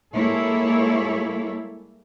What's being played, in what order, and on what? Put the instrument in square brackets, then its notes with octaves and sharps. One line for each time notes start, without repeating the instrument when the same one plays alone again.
[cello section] G3 G#3 A#3 E4 A4 C#5